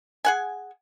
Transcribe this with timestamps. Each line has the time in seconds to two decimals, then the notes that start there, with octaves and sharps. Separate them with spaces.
0.25 G#4 F#5 G#5